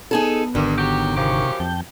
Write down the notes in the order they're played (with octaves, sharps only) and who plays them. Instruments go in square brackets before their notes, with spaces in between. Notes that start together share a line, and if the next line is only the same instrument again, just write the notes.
[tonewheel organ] B3 [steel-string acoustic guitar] D#4 G#4 A4
[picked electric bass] G#1 D3 [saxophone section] G2 [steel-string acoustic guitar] D#3
[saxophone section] F#3 G4
[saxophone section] F#2 F3 G4 [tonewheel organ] C3 C#6
[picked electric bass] F2 [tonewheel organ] G5 A5 G6